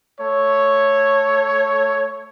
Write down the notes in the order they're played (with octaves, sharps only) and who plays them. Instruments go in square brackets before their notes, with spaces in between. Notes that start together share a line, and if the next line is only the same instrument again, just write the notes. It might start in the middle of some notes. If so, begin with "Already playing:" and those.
[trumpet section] A3 C#5